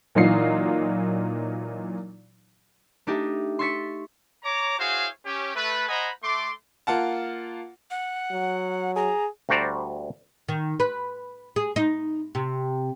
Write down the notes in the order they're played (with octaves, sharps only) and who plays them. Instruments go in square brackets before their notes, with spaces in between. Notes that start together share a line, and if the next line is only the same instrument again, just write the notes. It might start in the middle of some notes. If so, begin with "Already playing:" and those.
[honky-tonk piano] A#2 E3 F#3 D#4 F4 C7
[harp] A3 D4 D#4 G4
C6 C#6 E6 A6 B6 C#7
[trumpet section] C#5 A#5 D6
E4 F#4 G#4 C5 C#5 F5
C#4 G4
A3 B4
C5 D#5 F#5 G#5 A#5 B5
A3 C6 D6
[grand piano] A#3 F4 F#5 A5
[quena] F#5
[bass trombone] F#3
[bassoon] G#4 [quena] A#5
[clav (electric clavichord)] D2 G3 F#4 C5 D5 A#5
[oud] D#3
B4
G#4
D#4
C3